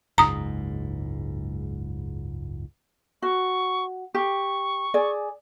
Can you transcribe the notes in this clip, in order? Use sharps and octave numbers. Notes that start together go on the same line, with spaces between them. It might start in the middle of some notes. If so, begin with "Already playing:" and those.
F#1 C#2 G#2 A#5 D#6
F#4 C#6
G4 C#6
G#4 D5